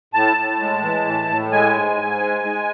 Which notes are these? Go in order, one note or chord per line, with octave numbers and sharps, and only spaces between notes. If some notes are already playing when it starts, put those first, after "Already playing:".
A2 A5
A2
G#3
E3
A2
A2
G#3 G#5
G#2
G#2
G#3
G#3